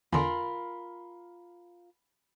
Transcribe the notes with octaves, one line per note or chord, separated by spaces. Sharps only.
E2 D3 F4 A#4 G#5 B5 C6